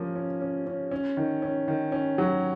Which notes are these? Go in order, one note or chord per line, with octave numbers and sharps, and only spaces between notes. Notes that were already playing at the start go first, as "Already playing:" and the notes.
Already playing: F3 A#3 C#4
C#4
C#4
C#4
C#4
D#3
C#4
D#3
C#4
F#3